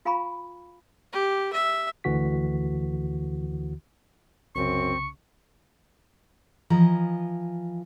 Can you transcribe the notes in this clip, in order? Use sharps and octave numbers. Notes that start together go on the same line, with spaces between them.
F4 F5 G#5 A#5 B5 C#6
G4
E5
D2 D3 E3 F#4 B6
C2 F#2 C#3 C4 C#6
E3 F3 D#5 G#5 A#5